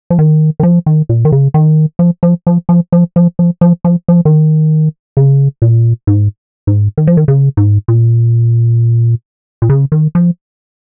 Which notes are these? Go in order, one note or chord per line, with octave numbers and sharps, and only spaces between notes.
F3
D#3
D#3
F3
D#3
A#2
D#3
C#3
D#3
F3
F3
F3
F3
F3
F3
F3
F3
F3
F3
D#3
C#3
A#2
G#2
G#2
D#3
F3
D#3
C#3
G#2
A#2
A#2
C#3
D#3
F3